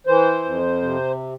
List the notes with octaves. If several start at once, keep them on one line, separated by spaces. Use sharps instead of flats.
E3 C5
F2
C3